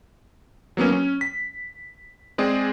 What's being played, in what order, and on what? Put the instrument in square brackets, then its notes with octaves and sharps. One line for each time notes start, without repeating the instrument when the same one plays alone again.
[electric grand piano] F#3 A#3 B3 C#4
C#4
B6
G#3 C4 G#4 D5